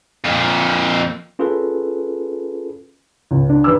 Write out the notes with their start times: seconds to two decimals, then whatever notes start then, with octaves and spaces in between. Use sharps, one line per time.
0.24 F2 A#2
1.39 C#4 F4 G#4 A4 B4
3.31 C#2
3.50 D4
3.64 D#2 B4 E6